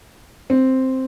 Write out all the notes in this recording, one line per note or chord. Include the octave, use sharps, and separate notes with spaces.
C4